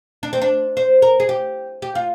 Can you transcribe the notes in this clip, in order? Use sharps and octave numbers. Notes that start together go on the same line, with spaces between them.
D4
C4
D4
C5
A#4
G#4
G4
G4
F4